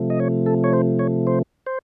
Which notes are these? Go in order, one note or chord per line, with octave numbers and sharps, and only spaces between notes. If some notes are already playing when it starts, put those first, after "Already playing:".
Already playing: C3 F3 A3
D#5
C#5
A4
C#5
C5
C#5
C5
C5